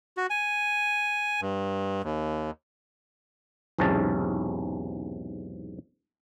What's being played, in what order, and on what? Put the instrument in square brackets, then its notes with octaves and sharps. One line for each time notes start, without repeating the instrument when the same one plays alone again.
[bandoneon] F#4
G#5
G2
D#2
[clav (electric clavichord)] B1 E2 G#2 C3 C#4 A5